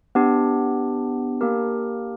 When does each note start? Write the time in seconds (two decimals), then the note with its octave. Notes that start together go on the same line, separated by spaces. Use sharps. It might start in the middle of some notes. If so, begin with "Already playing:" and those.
0.15 B3 D4 G4
1.41 A#3 D4 G4 A#4